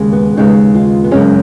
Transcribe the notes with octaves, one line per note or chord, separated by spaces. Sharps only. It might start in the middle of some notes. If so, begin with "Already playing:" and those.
Already playing: D#2 C#3 G#3
B3
D#2 C#3 G#3 B3 D#4
F4
B3
F#2 C#3 G#3 C#4